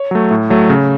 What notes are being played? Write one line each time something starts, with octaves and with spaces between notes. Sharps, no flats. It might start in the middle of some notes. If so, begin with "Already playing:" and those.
Already playing: C#5
F#3 A3
A2
F#3 A3
C#3